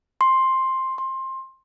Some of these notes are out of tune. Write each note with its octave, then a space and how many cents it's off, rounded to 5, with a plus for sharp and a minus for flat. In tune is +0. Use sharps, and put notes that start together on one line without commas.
C6 +10
C6 +20